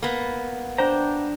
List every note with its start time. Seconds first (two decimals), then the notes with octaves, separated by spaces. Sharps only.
0.02 A#3 B3
0.78 D4 C5 G5 A#5